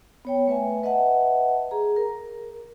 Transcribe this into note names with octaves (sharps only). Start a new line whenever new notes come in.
B3 C#5 G5
A3 B4 E5 G#5
B4 D#5 E5 F#5 A5
G#4 A#5
A#4